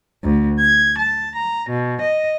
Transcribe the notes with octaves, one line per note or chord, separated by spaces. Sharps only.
D2
G#6
A5
A#5
B2
D#5